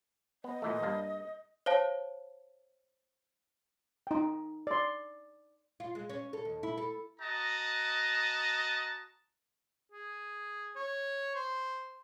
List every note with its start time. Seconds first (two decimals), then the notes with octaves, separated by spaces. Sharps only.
0.44 B3 D#5
0.62 A#2 E3 A3
0.82 G2 A#3 D4
1.66 C5 C#5 F5 A5
4.07 D#4 G5
4.67 D5 C6
5.80 F4
5.95 G#3
6.09 C#4
6.33 A4
6.45 D#2
6.63 E4
6.77 A4
7.20 F#4 D#5 A5 A#5
9.92 G#4
10.76 C#5
11.35 C5